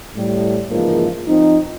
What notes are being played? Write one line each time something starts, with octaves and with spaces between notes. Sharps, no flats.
A2 G3
C#2 G#2 E3 F3 A#3
F3 C4 D#4